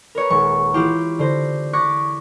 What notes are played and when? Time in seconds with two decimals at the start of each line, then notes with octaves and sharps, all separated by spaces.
0.15 A#4 B4 C#5 A#5
0.30 D#1 G#3 C#6
0.74 E3 E4 F4 G4
1.19 D3 C5 A#6
1.73 C#6 D6 F#6 G#6 A#6 B6